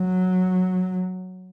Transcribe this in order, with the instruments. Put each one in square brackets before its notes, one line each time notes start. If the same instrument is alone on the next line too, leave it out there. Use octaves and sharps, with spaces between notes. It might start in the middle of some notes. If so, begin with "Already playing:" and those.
Already playing: [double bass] F#3